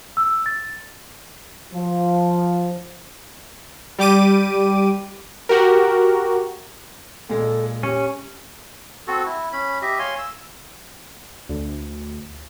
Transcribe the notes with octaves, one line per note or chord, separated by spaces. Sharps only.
E6
A6
F3
G3 G4 D6 D#7
F#4 G4 A#4
A#2 G#3 A4
C#4 G4
C4 F#4 A4
E4
C#4 B5
G4 D#5 E5
C#5 F5 G#5 C6
E6
D2